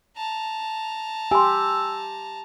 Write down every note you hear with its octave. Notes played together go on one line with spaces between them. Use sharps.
A5 A#5
G4 G#5 C6 E6